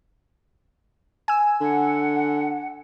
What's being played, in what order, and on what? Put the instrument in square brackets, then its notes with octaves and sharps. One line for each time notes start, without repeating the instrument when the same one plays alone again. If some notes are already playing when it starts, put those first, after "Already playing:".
[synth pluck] G#5 E6
[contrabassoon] D3 [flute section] F#5